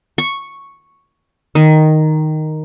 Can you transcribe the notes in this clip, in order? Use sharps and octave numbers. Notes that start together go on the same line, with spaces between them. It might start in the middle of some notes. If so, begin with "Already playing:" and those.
C#6
D#3